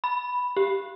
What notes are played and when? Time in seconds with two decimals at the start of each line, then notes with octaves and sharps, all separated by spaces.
0.04 B5
0.57 G4